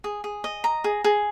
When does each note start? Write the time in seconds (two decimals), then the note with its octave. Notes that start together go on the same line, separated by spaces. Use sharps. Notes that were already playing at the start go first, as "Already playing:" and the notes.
0.04 G#4
0.24 G#4
0.44 D#5
0.64 A#5
0.84 G#4
1.04 G#4